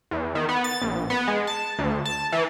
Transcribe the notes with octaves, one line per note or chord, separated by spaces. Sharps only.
E2
D#3
B3
A6
A#1
B3
G#3
A5
D2
A5
E3